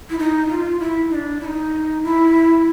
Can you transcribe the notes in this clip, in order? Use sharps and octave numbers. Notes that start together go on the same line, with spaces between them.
E4
D#4
F4
E4
D#4
D4
E4
D#4
E4